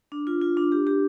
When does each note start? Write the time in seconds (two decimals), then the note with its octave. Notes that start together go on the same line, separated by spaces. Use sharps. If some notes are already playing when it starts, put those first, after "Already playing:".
0.12 D4
0.27 F4
0.41 F4
0.57 D4
0.72 G4
0.87 G4